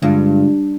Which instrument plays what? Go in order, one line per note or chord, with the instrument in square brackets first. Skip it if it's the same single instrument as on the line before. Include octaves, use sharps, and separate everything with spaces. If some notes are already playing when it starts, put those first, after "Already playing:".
[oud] G2 [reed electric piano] D3 G#3 D4 F4